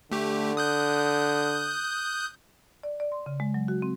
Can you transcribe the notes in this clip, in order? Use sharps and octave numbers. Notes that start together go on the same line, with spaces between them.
D3 A3 G4
D#6 F#6 G6
D5
D5
C6
C#3
G#3
F#3
F#4
C4